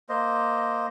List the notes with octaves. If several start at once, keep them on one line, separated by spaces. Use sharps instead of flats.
A#3 C5 D#5